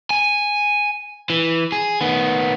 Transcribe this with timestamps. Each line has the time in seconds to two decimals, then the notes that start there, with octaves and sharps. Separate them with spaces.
0.10 G#5
1.30 E3
1.72 G#4
2.01 D#3 B3